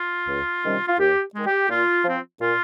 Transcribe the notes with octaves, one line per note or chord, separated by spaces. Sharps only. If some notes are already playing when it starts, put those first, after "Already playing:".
Already playing: F4
C#2
C3 D#3 G3 C#4
F4
D#2 G4
D#3 G#3
G4
A#2 F4
F3 C4
A#2 F4